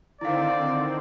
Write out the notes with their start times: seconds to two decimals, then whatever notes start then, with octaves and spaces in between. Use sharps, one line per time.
0.21 D3 D#3 C4 E4 D5 F5